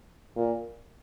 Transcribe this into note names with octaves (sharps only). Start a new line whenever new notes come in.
A#2